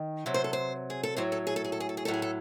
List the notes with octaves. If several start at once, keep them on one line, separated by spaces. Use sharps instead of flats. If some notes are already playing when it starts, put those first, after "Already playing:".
Already playing: D#3
C3 F#3
C5
A4
C5
G#4
A4
A2 F#3 C5
A4
G#4
A4
G#4
A4
G#4
A4
G#4
A2 F#3 A4
G#4
A4